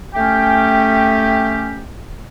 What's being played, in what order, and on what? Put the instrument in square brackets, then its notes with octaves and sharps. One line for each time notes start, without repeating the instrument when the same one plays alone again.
[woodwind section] A3 C#4 G4 [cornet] G5